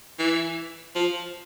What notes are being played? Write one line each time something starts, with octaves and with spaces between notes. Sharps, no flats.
E3
F3